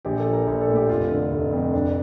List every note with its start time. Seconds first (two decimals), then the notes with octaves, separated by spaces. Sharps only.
0.05 A#1 G4
0.19 A4
0.26 F3
0.33 A#4
0.47 A#1
0.61 A4
0.68 A2
0.76 G4
0.89 F1 F4
1.10 D3
1.31 F1
1.53 F2
1.73 F1 D4